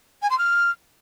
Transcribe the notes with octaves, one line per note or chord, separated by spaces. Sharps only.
G#5
C6
F6